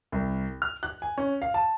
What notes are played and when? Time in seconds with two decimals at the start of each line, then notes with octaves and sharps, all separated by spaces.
0.12 C2
0.62 F6
0.83 F#6
1.02 G#5
1.18 C#4
1.42 F5
1.54 A5